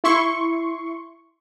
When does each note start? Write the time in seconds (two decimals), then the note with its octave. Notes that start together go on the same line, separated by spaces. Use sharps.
0.04 E4 C6 C#6